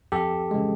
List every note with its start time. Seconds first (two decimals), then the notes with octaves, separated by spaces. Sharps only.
0.12 F2 G4 A4
0.51 C#3 E3 G#3